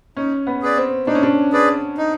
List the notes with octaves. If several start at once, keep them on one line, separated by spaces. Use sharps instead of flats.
C#4 D#4
B3
G#4 B4 D5
C4
D4 D#4
C#4
D4
G#4 B4 D5
D#4